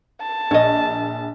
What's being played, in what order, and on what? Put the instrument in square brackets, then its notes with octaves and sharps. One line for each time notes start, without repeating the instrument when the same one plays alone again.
[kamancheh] A5
[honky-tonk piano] A#1 [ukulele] C#5 D#5